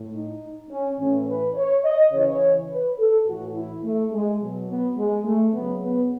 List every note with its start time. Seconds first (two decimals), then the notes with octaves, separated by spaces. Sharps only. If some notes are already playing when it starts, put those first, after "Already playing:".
Already playing: A2
0.14 D#4
0.70 C#4
0.99 A2 E3 C#4
1.28 B4
1.55 C#5
1.84 D#5
2.12 C#3 E3 C#5
2.70 B4
2.98 A4
3.26 A2 E3 F#4
3.54 E4
3.83 A3
4.11 G#3
4.41 B2 F#3
4.69 B3
4.97 G#3
5.25 A3
5.54 C#3 F#3 B3
5.82 B3